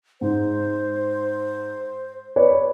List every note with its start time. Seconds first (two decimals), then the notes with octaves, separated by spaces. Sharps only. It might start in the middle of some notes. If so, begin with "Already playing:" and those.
0.21 G#2 C5
2.36 B4 C#5 D5